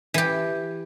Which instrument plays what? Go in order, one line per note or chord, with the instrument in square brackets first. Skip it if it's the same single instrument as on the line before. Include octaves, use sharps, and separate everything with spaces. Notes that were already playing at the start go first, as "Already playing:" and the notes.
[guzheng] E3 G4